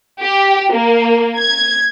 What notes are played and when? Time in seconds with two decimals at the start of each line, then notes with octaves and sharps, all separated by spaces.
0.21 G4
0.72 A#3
1.38 G#6